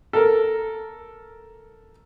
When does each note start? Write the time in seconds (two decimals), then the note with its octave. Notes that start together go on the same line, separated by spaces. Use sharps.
0.13 A4 A#4